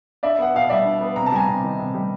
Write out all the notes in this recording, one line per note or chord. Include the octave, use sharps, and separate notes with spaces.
D4 D5 E5
B3 F#5
B2 F5
G3 D5 E5
D4
B3
C3 A#5
A5
G3 G#5 A#5
C3
D#3
C3
G3